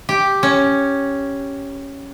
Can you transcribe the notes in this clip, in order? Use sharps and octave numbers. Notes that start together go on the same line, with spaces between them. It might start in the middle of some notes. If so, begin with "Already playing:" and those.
G4
C#4